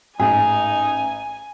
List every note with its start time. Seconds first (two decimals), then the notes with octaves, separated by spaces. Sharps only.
0.20 A1 G#2 D#4 G#4 G#5